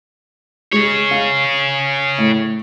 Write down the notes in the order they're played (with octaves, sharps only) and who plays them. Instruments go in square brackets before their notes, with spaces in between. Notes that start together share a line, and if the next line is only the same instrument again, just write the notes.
[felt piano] G#3 [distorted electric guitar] G#4 C#5
[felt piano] F5
A2